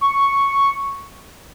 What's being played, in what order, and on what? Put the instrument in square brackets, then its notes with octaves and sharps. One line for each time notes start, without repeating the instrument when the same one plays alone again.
[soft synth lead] C#6